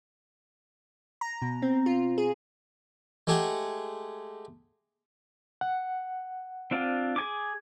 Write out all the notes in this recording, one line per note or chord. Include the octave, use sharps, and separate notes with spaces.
A#5
B2
C4
F4
G#4
G#3 A3 G4 G#4 F#5
F#5
C4 D4 F4
G#4 G#5 D6